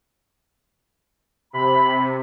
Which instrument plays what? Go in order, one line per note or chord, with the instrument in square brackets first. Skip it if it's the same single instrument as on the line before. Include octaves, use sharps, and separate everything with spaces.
[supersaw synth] C3 [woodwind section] B5